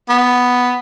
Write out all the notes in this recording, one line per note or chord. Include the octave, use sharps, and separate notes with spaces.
B3